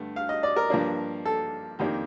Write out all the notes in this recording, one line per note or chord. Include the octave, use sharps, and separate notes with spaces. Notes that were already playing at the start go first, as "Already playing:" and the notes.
Already playing: G2 D3 A3
F5
D#5
D5
A#4
G2 F3 A#3 D4
A4
F2 D#3 A#3 D4 G4